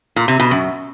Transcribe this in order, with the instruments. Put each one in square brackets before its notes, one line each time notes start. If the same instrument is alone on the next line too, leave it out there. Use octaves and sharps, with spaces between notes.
[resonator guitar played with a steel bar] A#2
C3
B2
F#2